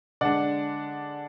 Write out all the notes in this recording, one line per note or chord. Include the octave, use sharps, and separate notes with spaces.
D3 G#3 D4 D5 F#5